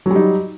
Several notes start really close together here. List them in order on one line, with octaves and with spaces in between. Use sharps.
F#3 G3 D#4